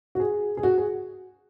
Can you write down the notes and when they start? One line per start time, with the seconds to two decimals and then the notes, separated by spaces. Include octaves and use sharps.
0.15 F#4
0.20 G#4
0.57 G#4
0.63 F#4
0.78 G#4